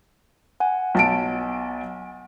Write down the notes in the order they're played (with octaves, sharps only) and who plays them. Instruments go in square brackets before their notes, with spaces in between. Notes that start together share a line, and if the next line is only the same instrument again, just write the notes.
[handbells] F#5 G#5
[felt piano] B1 A5 D7